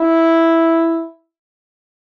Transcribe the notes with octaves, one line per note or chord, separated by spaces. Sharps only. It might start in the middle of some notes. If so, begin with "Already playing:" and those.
Already playing: E4